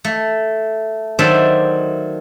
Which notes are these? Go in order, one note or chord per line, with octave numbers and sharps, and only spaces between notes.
A3
D#3 F#3 C5 D5 E5 A5